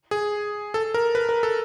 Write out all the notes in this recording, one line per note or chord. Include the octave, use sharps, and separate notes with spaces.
G#4
A4
A#4
B4
A#4
A4